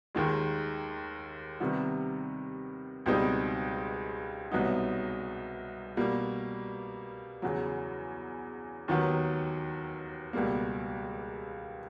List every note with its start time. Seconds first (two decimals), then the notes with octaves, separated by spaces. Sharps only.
0.15 D#2 D#3 G#3
1.60 C3 D#3 G3 B3
3.06 C#2 B2 G3 C4 D#4
4.51 C2 B2 F#3 B3 D#4
5.97 B2 G3 A#3
7.42 E2 C#3 F#3
8.88 D#2 D#3 F#3 B3
10.33 C#2 B2 G3 A#3